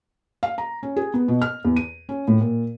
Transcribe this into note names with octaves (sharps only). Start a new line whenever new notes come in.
F5
A#5
C#4
G#4
B3
B2
F6
E2
D#7
C#4
A2
A#2